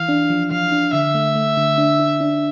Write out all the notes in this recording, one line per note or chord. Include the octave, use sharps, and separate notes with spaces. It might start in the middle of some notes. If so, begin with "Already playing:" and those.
Already playing: E3 F5
D4
F3
F3 F5
D4
D3 E5
A3
A3
D3
D4
D4
D4